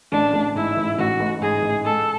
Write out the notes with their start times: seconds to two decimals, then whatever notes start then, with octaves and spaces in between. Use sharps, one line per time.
0.12 A1 D4
0.33 A1
0.55 G#2 E4
0.77 A1
0.98 A1 F#4
1.20 A1
1.41 G#2 G#4
1.63 A1
1.84 G#3 A4